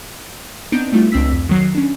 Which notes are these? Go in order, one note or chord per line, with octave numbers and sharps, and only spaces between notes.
B3 C4 D4 D#4 G6 D7
G3 A3 B3 E4 F4
C#2 C4 D4 E6 B6
F2
D#3 F#3 C7
C#4 D4